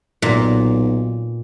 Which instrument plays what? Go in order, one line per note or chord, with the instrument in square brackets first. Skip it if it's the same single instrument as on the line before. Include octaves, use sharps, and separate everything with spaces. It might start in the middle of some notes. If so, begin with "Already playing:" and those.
[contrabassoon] B1 [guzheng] A#2